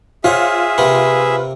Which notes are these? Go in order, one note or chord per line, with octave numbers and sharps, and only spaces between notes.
F4 G#4 C5 C#5 E5 F#5
C3 A#3 C4 B4